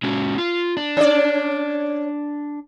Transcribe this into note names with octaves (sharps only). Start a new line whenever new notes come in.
G#3 C#4 F#4
F4
D4
C#4 D5